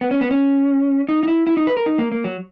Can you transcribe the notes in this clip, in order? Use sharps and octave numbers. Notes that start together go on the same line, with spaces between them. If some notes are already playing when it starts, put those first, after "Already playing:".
B3
C#4
B3
C#4
D#4
D#4
E4
E4
D#4
B4
A#4
D#4
A#3
A#3
F#3